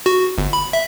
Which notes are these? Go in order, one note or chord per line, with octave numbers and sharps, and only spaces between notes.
F#4
G1
B5
E5